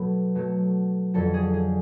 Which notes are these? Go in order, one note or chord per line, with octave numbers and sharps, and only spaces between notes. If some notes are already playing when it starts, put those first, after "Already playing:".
Already playing: B2 F#3 A3 B4
B2 F#3 A3
F2 D3 F#3 A4
G#4
G#4